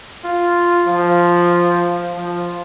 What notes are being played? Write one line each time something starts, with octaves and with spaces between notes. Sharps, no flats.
F4
F3
F3